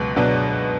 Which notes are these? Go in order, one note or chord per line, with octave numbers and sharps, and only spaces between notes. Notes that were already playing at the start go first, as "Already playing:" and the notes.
Already playing: C#2 B2 F#3 B3
B2 F#3 B3 D4